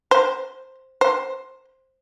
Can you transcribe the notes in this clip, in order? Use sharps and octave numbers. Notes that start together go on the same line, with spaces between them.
C5
C5